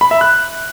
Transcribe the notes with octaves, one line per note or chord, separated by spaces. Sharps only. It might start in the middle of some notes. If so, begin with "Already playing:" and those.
B5
E5
F#6